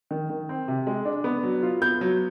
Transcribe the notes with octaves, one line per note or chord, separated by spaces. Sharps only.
D#3
D#3
C4
C3
G#3
D4
B3
F#3
F4
B3 G6
F#3